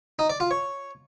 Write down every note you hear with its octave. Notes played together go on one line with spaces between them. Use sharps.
D#4
D5
F4
C#5